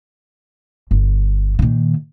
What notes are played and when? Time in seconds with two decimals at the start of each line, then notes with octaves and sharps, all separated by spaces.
0.91 G1
1.59 A#2 D#3